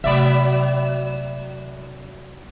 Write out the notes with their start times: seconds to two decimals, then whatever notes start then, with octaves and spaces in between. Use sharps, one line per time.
0.04 C3 F#3 A3 D5 E5